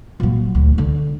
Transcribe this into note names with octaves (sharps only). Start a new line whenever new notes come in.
A#2 F#3
D2
D3